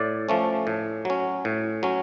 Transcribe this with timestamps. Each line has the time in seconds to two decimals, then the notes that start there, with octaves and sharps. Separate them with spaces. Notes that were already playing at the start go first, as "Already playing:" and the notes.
Already playing: A2 D5
0.29 F3 A3 C#4
0.67 A2
1.05 F#3 C#4
1.45 A2
1.83 F#3 C#4